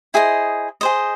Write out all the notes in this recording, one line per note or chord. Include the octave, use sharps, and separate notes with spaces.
E4 G#4 C5 D#5
G#4 C5 D#5